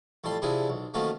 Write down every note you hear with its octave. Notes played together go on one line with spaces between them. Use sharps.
F2 A2 G3 A5 C6
C3 F3 D4 E4 G#4
B1
D#3 F3 F#3 A3 A#3 C#4